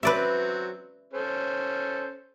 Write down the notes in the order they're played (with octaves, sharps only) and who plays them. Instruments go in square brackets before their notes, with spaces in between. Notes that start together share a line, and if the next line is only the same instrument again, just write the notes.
[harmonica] F#3 C4 [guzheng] B4 D5 E5
[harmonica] C#4 A4 C5